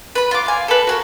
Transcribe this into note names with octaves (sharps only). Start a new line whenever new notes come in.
B4 B5
F4 D6
F5 G#5
A4 B4
F#4 G#4 A#4